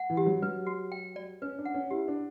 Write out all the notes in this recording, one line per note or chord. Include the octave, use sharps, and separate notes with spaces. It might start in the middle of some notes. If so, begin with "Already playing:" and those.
Already playing: F#5
E3
G4
F#3
F#3 B4
F#4
G5
D5
C#4 B4
D4
F#5
C#4
E4 G4
D4